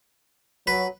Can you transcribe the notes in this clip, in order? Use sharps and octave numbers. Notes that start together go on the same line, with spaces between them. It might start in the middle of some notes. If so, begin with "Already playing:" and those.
F#3 B4